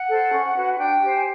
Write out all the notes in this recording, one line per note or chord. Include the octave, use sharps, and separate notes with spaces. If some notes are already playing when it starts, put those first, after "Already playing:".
Already playing: F#5
A4 C5
C#4
F#4 B4
D4 G5
G4 C5
G#5